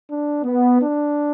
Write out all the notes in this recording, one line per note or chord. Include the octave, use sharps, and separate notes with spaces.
D4
B3
D4